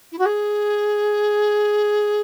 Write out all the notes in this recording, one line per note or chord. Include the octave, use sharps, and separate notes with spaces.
E4
F#4
G#4